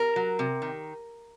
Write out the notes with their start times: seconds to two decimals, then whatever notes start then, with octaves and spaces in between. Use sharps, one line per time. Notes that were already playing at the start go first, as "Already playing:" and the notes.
Already playing: A#4
0.16 F#3
0.39 C3
0.62 D#3